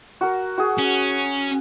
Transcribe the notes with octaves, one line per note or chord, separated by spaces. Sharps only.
F#4 A#4
F#4 G#4
C#4